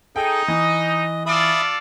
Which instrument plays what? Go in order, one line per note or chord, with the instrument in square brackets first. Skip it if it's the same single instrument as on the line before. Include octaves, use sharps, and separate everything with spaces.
[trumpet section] D#4 [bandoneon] G#4 A4 [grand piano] G5
[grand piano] E3 [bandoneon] D#5
[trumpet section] F4 A4 D5 [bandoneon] E5 B5 D#6